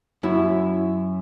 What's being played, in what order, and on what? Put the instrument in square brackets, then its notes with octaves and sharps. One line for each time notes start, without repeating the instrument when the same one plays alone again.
[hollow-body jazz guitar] F#2 E4